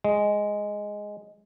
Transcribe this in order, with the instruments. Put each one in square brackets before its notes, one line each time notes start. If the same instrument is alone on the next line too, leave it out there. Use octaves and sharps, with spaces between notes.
[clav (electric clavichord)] G#3